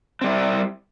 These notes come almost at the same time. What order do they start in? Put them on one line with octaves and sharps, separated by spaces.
C4 G3 E4